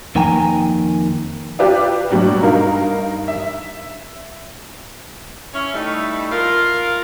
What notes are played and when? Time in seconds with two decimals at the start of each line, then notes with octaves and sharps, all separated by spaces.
0.15 F2 D#3 A#3 G5 G#5 A#5
1.59 F4 G4 B4 D5 E5 F5
2.10 B2 F#3 G3 D4 F#4 G4
2.41 G2 D#4 A#4 F5
3.28 E5
5.53 C#4 E4
5.74 G3 A3 D#4 E4
6.31 F4 A#4